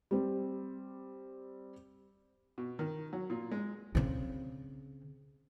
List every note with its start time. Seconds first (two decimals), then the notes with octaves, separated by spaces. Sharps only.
0.11 G3 C4
2.58 B2
2.79 D#3
3.13 F#3
3.30 A#2
3.51 G#3
3.95 C#3 C4